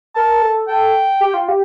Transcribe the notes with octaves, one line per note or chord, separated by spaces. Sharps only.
A#4 A5
A4
A4 G5
G4
F4
G4